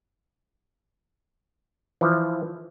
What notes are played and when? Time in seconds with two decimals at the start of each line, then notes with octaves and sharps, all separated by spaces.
2.01 E3 F3